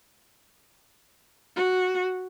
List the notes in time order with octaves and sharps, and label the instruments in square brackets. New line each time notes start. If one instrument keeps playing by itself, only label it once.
[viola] F#4